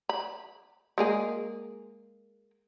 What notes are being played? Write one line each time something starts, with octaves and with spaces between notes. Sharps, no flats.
B5
G#3 A#3 G#4